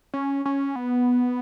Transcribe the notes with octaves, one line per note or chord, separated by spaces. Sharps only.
C#4
C#4
B3